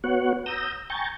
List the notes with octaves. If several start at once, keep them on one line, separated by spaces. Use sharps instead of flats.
B3 F#4 C#5 F#5
A#5 D#6 E6 G6
G5 G#5 A#5 C#6 G6 A6